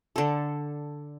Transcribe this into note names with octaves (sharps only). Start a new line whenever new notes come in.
D3 A4